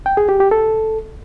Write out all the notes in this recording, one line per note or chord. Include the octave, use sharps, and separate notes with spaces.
G5
G#4
G4
G4
A4